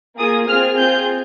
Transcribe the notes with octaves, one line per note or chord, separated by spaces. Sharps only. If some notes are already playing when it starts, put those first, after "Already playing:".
A#3 F4 G#4 D#6
C4 F4 G#4 F6
C4 F4 G#4 G6